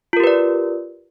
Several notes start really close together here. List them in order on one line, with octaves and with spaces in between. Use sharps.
F4 A#4 G4 B4 D5